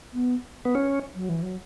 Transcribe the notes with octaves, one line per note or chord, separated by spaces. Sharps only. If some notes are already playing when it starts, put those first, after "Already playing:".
B3
B3
C#4
F#3
E3
F#3